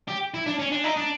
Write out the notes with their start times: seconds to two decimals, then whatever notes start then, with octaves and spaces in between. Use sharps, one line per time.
0.08 G4
0.34 E4
0.46 D4
0.59 C#4
0.72 D4
0.84 D#4
0.97 D4